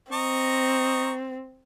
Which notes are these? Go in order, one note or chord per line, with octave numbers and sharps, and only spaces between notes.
C4 D#5 A#5 C#6